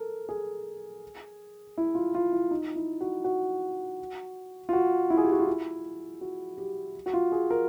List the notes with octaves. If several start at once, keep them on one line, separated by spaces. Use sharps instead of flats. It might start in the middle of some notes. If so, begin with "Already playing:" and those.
Already playing: A4 A#4
G#4
E4
F4
F4
E4
D#4
E4
F#4
F#4
F4
F#4
E4
G#4
G4
F#4
F4
E4
F#4
G4
F#4
F4
G#4
A#4